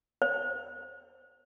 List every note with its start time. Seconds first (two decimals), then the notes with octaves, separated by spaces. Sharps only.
0.22 C5